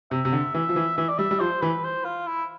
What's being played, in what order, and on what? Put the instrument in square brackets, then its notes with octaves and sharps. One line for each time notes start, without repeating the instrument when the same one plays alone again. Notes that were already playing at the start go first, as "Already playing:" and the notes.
[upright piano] C3 [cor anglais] E5
[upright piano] C3
D3
[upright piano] E3 [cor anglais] E5
[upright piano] F3
E3
[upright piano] E3 [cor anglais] E5
[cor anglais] D5
[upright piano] G3 [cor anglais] E5
[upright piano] G3
[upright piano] F3 [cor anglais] C5
[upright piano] E3 [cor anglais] B4
[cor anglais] C5
F4
E4